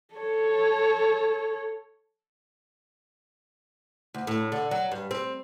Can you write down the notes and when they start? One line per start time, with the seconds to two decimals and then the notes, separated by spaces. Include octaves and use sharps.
0.15 A4 C#5
4.14 D2
4.27 A2
4.52 D3
4.71 F#3
4.91 G2
5.11 C4